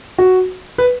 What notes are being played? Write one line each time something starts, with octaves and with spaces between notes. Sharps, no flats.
F#4
B4